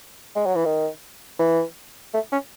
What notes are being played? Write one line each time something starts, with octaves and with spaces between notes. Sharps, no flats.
G#3
F#3
E3
D#3
E3
A3
C#4